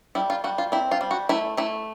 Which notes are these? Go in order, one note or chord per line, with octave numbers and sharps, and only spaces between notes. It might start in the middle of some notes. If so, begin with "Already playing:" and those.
G3 E4
F4
G3 F#4
F4
C4 E4
F4
G3
F#4
A3 E4
A3 E4